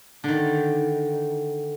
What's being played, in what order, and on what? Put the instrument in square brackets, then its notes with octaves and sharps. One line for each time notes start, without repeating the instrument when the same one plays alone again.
[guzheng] D3 D#3